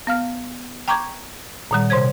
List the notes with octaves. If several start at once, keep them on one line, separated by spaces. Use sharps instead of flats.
B3 F5 F6
G5 A#5 C#6 D6 G6 G#6
A#2 D#3 G3
C3 C5 C#5 G#6